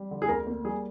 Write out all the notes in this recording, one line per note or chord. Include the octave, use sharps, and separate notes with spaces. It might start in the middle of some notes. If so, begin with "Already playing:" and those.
Already playing: G3
D3
G#4
D2 A#4
A#3
G3 G#4